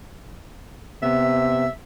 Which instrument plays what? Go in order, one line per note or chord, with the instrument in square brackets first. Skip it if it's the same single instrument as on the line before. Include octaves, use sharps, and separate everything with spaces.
[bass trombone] C3 [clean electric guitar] B3 [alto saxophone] E5